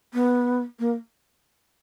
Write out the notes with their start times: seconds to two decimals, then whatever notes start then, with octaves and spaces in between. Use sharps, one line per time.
0.14 B3
0.79 A#3